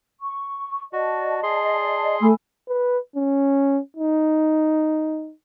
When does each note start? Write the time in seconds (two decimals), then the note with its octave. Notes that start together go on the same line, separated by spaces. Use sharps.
0.21 C#6
0.93 F#4 D5 D#5 A5
1.43 G#4 C6
2.21 A3 G#5 B5 E6
2.68 B4
3.16 C#4
3.97 D#4